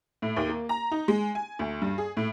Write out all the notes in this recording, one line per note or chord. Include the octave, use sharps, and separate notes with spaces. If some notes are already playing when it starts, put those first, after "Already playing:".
A2
D#2
A#3
A#5
D#4
G#3
G#5
D2
G2
G#4
A2